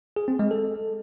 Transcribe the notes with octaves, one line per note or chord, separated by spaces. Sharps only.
G#4
C4
G#3
A4